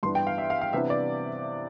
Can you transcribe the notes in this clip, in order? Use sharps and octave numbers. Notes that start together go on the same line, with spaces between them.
G2 E3 B3 D4 C6
G5
F5
E5
F5
F5
C3 E3 B3 D4 E5
D5